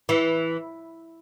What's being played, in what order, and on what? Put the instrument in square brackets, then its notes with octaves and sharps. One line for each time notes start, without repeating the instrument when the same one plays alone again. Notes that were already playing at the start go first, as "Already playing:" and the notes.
[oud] E3